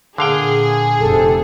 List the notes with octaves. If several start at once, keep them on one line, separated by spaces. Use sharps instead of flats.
A#2 D3 G#4 F5 G5
F1 C3 A4